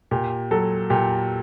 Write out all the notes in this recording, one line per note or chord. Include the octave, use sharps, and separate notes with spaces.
A#2 G4
F#3 A4
A#2 G4